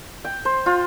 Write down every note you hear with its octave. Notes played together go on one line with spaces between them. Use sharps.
G5
C5
F4